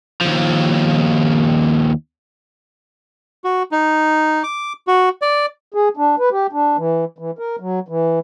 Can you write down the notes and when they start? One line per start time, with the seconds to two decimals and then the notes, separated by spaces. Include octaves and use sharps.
0.21 D#2 F3
3.44 F#4
3.71 D#4
4.44 D6
4.87 F#4
5.22 D5
5.74 G#4
5.97 D4
6.19 B4
6.31 G4
6.53 D4
6.77 E3
7.18 E3
7.39 A#4
7.60 F#3
7.88 E3